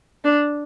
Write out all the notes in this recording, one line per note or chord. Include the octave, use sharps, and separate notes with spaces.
D4